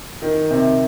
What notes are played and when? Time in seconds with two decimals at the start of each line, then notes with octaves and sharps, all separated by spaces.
0.22 D#3
0.50 C3